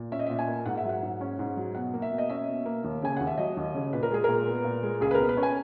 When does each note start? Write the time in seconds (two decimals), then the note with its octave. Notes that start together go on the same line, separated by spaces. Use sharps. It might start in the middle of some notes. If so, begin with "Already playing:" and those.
Already playing: A#2
0.12 C#4 E5
0.19 D#5
0.27 A#2 E5
0.39 G#5
0.48 A#3
0.66 G#2 F#5
0.77 E5
0.85 F#3 F#5
1.03 G#2
1.21 C#4
1.39 G#2
1.57 F#3
1.75 B2 F#5
1.94 A#3
2.02 E5
2.11 B2
2.18 D#5
2.29 C#4 E5
2.48 B2
2.66 A#3
2.84 D#2
3.02 C#3 G#5
3.17 D#2 F#5
3.27 E5
3.38 F#3 D#5
3.57 D#2
3.75 C#3
3.93 A#2 B4
4.03 A#4
4.11 G#3 G#4
4.24 A#2 A#4
4.48 B3
4.65 A#2
4.83 G#3
5.01 C#2 G#4
5.11 B4
5.14 B2 A#4
5.29 B4
5.37 C#4
5.43 G#5